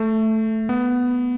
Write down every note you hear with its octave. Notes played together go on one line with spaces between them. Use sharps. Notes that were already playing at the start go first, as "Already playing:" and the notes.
Already playing: A3
B3